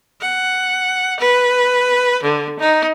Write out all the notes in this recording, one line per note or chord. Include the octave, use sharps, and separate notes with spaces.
F#5
B4
D3
D#4